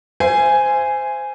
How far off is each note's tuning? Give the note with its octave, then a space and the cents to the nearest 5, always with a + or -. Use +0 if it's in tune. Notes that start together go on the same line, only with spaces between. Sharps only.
C5 -15 E5 +35 G#5 +0